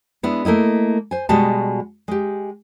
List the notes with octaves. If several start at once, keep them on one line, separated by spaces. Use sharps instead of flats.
G#3 B3 D4 E4
A3 A#3 E4 D#5
C5 G#5
B2 G3 G#3 F#4 A5
G#3 G4